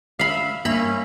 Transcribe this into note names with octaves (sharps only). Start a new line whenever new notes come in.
E5 F5 B5
G2 A#3 C#4 E5 B5